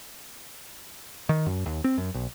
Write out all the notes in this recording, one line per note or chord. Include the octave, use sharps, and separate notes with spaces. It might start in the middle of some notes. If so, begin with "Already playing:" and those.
D#3
F#2
D#2
C4
F#2
B1